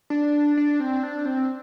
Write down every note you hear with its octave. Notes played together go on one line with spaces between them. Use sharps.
D4
D4
C4
D4
C4